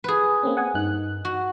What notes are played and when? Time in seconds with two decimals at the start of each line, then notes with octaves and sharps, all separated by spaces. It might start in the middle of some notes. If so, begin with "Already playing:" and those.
0.04 G#4 B4
0.43 A#3 C4 C#4
0.57 F#5 G#5 D#6
0.74 G2 D#4 F#6
1.25 F#4